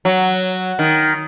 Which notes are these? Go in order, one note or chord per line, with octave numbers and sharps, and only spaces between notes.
F#3
D#3